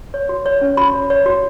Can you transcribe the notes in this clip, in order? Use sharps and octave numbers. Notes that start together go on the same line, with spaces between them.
C#5
F#4
C#5
C#4
F#4 B5
C#5
C#5
F#4